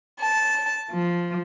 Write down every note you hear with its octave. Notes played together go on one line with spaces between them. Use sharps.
A5
F3